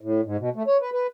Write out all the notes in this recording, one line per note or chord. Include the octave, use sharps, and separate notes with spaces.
A2
G#2
B2
A3
C#5
B4
B4